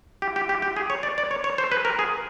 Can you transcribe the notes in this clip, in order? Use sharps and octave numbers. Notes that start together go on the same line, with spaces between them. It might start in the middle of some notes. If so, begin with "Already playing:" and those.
G4
G4
G4
G4
G#4
C#5
D5
D5
C#5
C#5
C5
B4
A#4
G#4